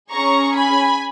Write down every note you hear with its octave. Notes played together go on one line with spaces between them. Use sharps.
C#4 G#4 A#5 C#6
G#5 B5